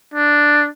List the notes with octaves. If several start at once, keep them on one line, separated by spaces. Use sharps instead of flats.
D4